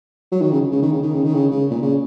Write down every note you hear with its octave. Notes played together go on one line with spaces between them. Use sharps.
F#3
D#3
C#3
C#3
D#3
C#3
D#3
C#3
D#3
C#3
C#3
A#2
C#3